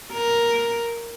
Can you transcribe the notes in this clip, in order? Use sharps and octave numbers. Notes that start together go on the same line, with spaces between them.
A#4